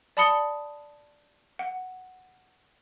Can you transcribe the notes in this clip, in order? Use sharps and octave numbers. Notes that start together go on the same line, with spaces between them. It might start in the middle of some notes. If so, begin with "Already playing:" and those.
D5 A5 B5 D#6 C#7 G7
F#5